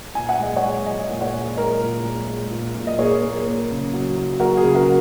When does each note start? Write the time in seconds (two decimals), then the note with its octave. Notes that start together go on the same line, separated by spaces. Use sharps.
0.15 A#2 G#5
0.29 F#5
0.39 G#3 D#5
0.56 C#5 F#5
0.62 G#3
0.86 G#3 D#5 G#5
1.09 A#2
1.21 C#5 F#5
1.34 G#3
1.57 G#3 A#4 D#5
1.81 A#2
2.04 G#3
2.28 G#3
2.51 A#2
2.75 A#2
2.87 D#5
2.99 A#3 G#4 C#5
3.22 A#3
3.46 A#3
3.70 C#3
3.93 F#3
4.16 F#3
4.40 A#3 F#4 A#4
4.57 G#4
4.63 C#3
4.75 F#4 A#4